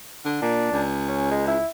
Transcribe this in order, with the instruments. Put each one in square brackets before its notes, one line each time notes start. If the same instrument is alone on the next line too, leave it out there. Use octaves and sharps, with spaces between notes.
[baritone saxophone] D3
[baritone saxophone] A#2 [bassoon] D4
[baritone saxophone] C#2
[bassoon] C#4
G#3
E4